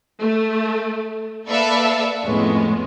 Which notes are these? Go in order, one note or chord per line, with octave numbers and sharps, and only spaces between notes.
A3
A#3 A4 B4 D5 E5 F5
F2 A2 G#3 B3 C#4